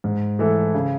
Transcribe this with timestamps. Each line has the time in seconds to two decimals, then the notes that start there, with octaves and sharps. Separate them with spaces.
0.04 G#2
0.39 E3 A3 E4 A4
0.74 C#3